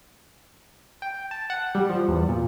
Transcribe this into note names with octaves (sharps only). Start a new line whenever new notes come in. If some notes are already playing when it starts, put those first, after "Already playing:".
G5
A5
F#5
G3
F3
E2
A#2